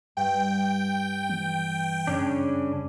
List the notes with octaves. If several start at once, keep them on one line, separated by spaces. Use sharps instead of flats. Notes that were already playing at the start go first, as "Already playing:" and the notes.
G2 G5
E3
F#2 C#3 C#4 D4